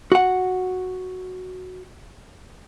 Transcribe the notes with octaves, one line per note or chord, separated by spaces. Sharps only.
F#4 F#5